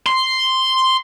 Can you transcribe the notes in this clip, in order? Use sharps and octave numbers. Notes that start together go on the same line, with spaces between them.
C6